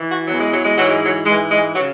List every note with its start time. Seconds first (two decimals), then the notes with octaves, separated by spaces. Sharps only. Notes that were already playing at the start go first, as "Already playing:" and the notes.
Already playing: E3
0.11 F#4
0.27 E2 E3 F#3
0.39 G#3
0.52 F#3
0.65 G#3
0.76 G#2 E3 F#3
0.91 G#3
1.03 F#3
1.25 G#2 G#3
1.29 E3
1.50 G#3
1.74 F#3
1.77 C#3